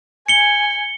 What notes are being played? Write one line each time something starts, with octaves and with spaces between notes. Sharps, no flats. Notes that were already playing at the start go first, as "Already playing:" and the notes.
G#5 C#7 G7